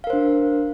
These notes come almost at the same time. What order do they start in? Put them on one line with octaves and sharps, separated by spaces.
F5 A#4 C5 D4